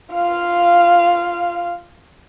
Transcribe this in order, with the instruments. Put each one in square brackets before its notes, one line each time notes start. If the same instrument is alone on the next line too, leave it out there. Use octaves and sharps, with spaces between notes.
[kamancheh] F4 F5